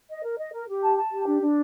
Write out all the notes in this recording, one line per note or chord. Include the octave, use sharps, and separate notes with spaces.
D#5
A#4
D#5
A#4
G4
A5
A5
G4
D4
D4